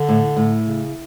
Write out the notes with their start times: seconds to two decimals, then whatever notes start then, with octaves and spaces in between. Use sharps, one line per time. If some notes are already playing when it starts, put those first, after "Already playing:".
Already playing: D3
0.09 A2
0.37 A2
0.66 C#3